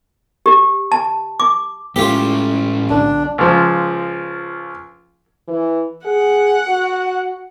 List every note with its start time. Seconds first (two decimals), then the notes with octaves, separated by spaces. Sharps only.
0.46 G4
0.92 A5
1.40 D6
1.96 A2 G#3 A3 C#4 F4 G4
2.90 B1 D3 D4
3.38 C#2 F3
5.48 E3
6.05 G#4 F#5
6.67 F#4